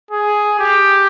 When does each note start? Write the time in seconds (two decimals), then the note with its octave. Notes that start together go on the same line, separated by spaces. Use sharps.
0.11 G#4
0.59 G4